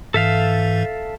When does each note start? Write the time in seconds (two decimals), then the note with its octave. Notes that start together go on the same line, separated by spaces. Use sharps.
0.14 G#2 E3 A4 E5 F5